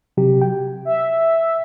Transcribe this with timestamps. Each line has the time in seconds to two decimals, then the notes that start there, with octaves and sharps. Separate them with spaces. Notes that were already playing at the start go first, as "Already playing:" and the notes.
0.17 C3 F#3 G4
0.42 G5
0.85 E5